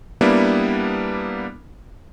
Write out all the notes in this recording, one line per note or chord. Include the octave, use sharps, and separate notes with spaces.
G3 A#3 B3 D4 E4